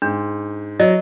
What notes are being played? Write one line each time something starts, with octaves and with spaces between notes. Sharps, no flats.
G#2 D4
F#3 D#5